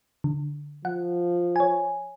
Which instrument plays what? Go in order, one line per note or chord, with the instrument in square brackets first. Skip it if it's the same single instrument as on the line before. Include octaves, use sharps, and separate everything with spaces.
[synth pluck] D3
[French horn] F3 [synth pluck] F#5
[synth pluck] C#5 G#5